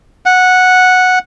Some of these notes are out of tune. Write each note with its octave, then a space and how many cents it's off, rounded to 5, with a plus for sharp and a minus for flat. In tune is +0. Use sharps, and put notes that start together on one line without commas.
F#5 -10